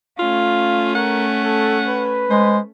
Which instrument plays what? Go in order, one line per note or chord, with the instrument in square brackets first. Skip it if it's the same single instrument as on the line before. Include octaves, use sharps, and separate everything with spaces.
[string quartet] A3 C#4 [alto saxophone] F4 [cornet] F5
[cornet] A#4 [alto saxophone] F#5
[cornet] A4
B4
[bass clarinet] G#3 [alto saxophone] C5